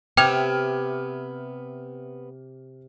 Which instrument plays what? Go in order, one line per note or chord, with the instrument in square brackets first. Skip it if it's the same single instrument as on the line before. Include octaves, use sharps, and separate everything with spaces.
[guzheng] C3 [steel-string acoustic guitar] B3 E5 [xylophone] G5 F7 [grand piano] D6 F6 G#6